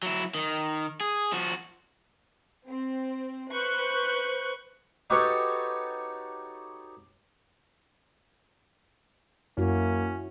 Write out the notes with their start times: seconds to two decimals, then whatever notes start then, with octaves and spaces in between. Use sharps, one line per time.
0.03 F#3 E4
0.35 D#3
1.01 G#4
1.33 F3 F#4
2.69 C4
3.52 B4 C5 C#6 F#6 G6
5.10 D#4 F#4 G4 A4 B4 C#5
9.58 F#2 A#3 C#4 E4 F#4